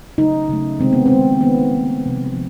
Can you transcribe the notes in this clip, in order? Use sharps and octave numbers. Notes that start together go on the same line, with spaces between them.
C#3 F#3 A3 D#4
C#3 F#3 A3
C3 D#3 G#3 C4
B3
C4
C3 D#3 G#3
D#3 G3 A#3 B3
D#3 G3 A#3
C3 F3 A#3
C3 F3